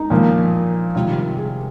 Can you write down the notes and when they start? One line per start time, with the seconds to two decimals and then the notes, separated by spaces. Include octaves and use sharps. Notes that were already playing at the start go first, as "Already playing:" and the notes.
Already playing: D#4
0.10 A#2 F3 A#3
0.95 C3 D#3 G3 F4
1.37 G#4